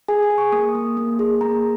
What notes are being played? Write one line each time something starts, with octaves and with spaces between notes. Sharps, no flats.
G#4 G#5
G#5
G#4
C#6
A#3 D#6
A#3
A#3
G#4
A#3 A#5